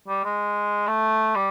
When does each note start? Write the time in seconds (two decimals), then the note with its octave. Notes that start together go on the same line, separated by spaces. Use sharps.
0.08 G3
0.25 G#3
0.88 A3
1.35 G3